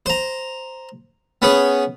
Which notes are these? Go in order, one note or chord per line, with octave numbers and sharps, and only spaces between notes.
C5 A#5
B3 C#4 G#4